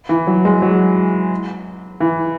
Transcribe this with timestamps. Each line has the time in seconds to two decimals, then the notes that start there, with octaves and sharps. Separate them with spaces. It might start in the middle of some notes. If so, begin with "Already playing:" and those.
0.09 E3
0.27 F#3
0.45 G#3
0.62 F#3
2.00 E3